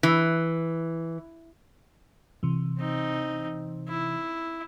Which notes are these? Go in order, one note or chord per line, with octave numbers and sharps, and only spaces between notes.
E3
C3 E3
C4 D#4
E4